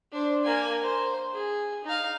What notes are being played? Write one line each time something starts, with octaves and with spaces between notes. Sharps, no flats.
D4 C5
A#3 G#5
C5
G#4
D#4 F5